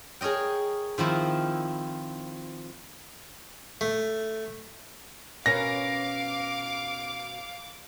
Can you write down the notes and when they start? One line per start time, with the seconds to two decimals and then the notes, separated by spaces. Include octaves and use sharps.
0.21 G#4 A#4 C#5 D#5 G5
0.98 D#3 F3 C4 E4
3.81 A3
5.46 B2 C#4 A#4 F5 D6 A#6